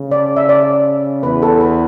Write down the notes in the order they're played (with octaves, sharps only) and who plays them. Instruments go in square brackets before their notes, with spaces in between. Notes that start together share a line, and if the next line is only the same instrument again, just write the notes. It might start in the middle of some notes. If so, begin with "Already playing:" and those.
Already playing: [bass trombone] C#3
[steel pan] D5
E5
D5
[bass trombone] E2 [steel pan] B4
[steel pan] A4
B4